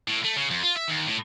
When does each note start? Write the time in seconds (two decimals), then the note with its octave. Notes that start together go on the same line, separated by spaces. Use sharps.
0.08 A2
0.25 A3
0.36 C#3
0.51 F2
0.63 F4
0.76 E5
0.88 D#2
1.07 A2